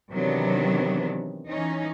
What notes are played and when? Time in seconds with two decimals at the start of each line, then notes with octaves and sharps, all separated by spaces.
0.12 C3 D#3 E3 F#3 B3 D4
1.48 E3 C#4 D#4